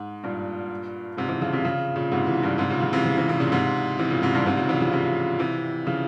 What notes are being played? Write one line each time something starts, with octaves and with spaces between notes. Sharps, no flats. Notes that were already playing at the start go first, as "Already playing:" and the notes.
Already playing: G#2
G2 A#2
G#2 C3
C3 E3
C#3 F3
C3 E3
C#3 F3
A#2 C#3
G#2 C3
C3 E3
G2 A#2
G#2 C3
A#2 C#3
C#3 F3
C3 E3
C#3 F3
C3 E3
C3 E3
A#2 C#3
G#2 C3
C3 E3
A#2 C#3
G#2 C3
G2 A#2
G#2 C3
A#2 C#3
C3 E3
C#3 F3
C3 E3
C3 E3
C#3 F3